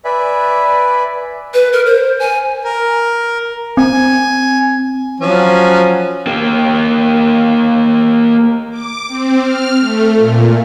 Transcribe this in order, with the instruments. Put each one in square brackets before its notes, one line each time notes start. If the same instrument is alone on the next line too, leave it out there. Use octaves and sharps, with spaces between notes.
[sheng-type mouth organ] B4 D5 E5 G#5 B5
[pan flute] B4
A#4
C5
G#5
[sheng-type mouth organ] A#4
[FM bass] C4 [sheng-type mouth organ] G#5
[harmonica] F3 F#3 C#4
[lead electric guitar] A#3 G4
[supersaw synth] D6
C4
F6
A3
A#2